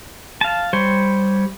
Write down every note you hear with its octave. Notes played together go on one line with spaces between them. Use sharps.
F5 A5
G3 C5 C#5